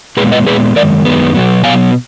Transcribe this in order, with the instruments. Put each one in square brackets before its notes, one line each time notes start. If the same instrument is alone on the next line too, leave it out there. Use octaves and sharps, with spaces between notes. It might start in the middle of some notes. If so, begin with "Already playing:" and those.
[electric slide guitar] A#2 G#3 B3 G#4 B4
B4 D#5
A#2 G#3 B3 G#4 B4
F#2 D#3 G#3 A#4 D5
F#2 D#3 G#3 B3
B2 F#3 B3
B2 F#3 B3 F5 G#5